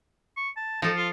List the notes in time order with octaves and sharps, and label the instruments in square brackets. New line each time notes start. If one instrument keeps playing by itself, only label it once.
[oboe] C#6
A5
[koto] F3 A4 [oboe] D#4
[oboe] F4